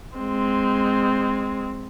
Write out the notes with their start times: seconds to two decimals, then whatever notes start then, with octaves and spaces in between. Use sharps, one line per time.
0.17 G#3 C4